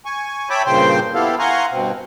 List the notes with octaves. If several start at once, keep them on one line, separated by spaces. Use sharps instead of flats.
G#5 C#6
C#5 E5 G5 A5 B5 D6
G2 A#2 C#3 C5 G5 C6
B3 E4 G4 A4 F5
F5 F#5 G#5 A#5 C6 C#6
G2 B2 C4